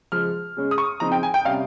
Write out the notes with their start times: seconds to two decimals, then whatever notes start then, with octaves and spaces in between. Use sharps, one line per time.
0.12 C#3 F3 G#3 F6
0.57 C#3 G#3 C#4
0.71 D#6
0.78 C#6
1.00 C#3 F3 C4 D#4 A#5
1.12 G5
1.23 G#5
1.34 G5
1.45 C3 G3 C#4 F5